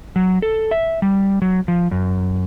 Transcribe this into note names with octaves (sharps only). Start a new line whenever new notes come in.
F#3
A4
E5
G3
F#3
F3
F#2